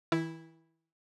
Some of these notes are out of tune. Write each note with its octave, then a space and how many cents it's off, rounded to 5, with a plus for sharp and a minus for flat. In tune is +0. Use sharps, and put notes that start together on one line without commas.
E3 -40 E4 +0